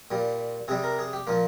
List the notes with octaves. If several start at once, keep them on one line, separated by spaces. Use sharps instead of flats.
A#2 G3
C3 G3 G#4
A#4
G#4
G4
A#2 F3 A#3